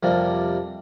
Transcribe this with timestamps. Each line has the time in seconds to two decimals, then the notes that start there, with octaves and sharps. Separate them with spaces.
0.03 F2 C3 G3 A#3 D4